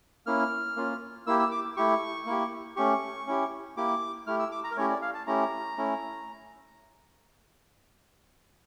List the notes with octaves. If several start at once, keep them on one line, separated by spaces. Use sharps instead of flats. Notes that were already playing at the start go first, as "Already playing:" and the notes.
A#3 C#4 E4 F6
A#3 C#4 F4
A#3 E4 G4 E6
E6
D6
A3 E4 G4 C#6
A#3 E4 G4
A3 C#4 G4 C#6
C#4 E4 G4
A#3 E4 G4 D6
A3 E4 G4 F6
E6
D6
A#5
A#4
A3 C#4 E4 G4 C#5
D5
F5
A5
A3 C#4 E4 G4 A#5
A3 C#4 E4